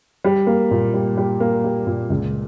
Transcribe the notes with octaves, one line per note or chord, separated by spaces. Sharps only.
G3
A#3
A#2
G3
G3
A#3
G3
A#2
C#2